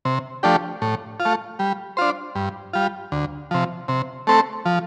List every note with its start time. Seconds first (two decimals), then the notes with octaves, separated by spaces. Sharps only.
0.05 C3
0.43 F3 A3 D4 G4
0.82 A2
1.20 F4
1.25 A3
1.59 G3
1.97 D4 F4 C5
2.35 G2
2.73 G3 F4
3.12 D2
3.51 C3 F3
3.88 C3
4.27 A3 C4 A4
4.65 F3